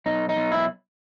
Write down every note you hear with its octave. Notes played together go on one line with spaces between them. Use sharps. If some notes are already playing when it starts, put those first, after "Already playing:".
B1 D#4
D#4
B1
E4